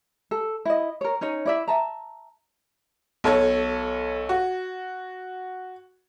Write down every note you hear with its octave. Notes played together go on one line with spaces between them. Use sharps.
A4
E4 D#5
A#4 C#5
C#4 D#4 C#5
E4 D5 E5
E5 A5 A#5
B1 A4 C#5 G#6
F#4